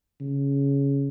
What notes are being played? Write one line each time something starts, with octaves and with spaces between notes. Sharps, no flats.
C#3